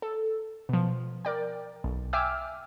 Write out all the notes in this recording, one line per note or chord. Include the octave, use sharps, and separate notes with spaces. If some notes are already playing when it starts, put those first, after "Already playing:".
A4
B2 F3
A#4 D5 G5
B1
E5 G5 G#5 D6 E6 F6